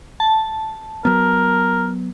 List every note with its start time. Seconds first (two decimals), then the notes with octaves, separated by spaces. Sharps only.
0.20 A5
1.05 F#3 B3 A#4